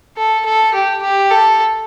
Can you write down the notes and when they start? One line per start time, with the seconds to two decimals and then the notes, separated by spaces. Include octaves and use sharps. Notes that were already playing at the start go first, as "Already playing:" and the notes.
0.17 A4
0.45 A4
0.74 G4
1.02 G4
1.31 A4